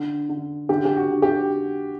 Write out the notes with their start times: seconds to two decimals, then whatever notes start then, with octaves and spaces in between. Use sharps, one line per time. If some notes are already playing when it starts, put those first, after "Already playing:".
Already playing: D3
0.29 D3
0.69 D3 G4
0.85 G4
0.96 F#4
1.10 D3
1.22 G4